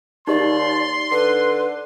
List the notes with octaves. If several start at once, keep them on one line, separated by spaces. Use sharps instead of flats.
D#2 D#4 G4 D5 D#5 C6
D3 B4